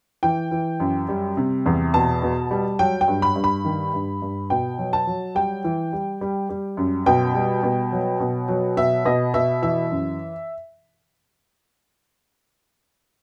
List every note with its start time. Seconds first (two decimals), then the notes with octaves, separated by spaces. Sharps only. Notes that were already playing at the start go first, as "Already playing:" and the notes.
0.23 E3 G5
0.51 E3
0.80 F#2
1.09 G3
1.37 C3
1.66 E2
1.94 B2 A5
2.22 B2
2.51 G3
2.79 F#3 G5
3.01 G5
3.08 G2
3.22 B5
3.36 G2
3.44 B5
3.65 D#3
3.94 G2
4.22 G2
4.50 B2 G5
4.78 F#3
4.93 A5
5.07 F#3
5.35 G3 G5
5.64 E3
5.93 G3
6.21 G3
6.49 G3
6.77 F#2
7.06 B2 G5
7.34 G3
7.63 B2
7.92 F#3
8.20 B2
8.48 F#3
8.77 B2 E5
9.05 B2 D#5
9.34 B2 E5
9.62 E3 E5
9.91 F#2